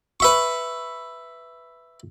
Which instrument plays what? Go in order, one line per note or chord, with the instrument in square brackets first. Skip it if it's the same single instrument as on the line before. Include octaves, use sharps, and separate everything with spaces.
[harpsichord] B4 E5 C#6